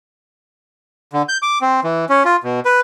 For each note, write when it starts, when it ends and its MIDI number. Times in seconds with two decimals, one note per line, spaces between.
1.13 1.22 50
1.29 1.38 91
1.42 1.59 86
1.61 1.80 60
1.84 2.05 52
2.09 2.23 61
2.25 2.37 65
2.43 2.60 47
2.65 2.81 71